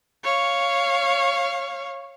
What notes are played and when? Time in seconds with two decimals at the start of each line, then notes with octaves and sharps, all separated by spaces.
0.23 C#5 F5